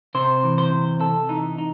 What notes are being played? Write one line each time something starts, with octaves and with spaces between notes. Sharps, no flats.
C3 C5
E3
C5
C3
C3 A4
E3 D#4
D#4